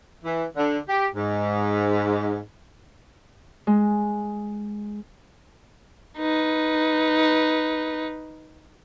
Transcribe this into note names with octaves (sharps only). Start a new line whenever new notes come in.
E3
D3
G4
G#2
G#3
D#4 B4